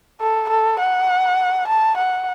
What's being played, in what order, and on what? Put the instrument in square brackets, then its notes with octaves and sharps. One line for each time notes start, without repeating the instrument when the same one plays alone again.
[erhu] A4
A4
F#5
A5
F#5